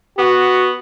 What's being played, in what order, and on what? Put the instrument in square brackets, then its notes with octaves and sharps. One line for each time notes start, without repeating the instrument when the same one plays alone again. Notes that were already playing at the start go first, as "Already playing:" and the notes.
[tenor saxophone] B3 [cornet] F#4